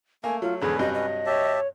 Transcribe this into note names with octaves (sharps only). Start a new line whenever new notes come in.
A3 A#3 G#5
F#3 F4
E2 G#2 D3 C#4 G#4 B4
G2 C3 F#3 D#5
D#5
G4 C#5 E5 A5